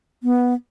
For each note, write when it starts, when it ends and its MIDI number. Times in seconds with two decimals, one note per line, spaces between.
0.23 0.54 59